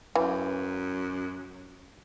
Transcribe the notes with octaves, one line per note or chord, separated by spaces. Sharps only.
F#2 E3